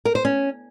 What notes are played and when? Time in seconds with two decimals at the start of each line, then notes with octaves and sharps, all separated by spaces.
0.05 A#4
0.15 C5
0.25 C#4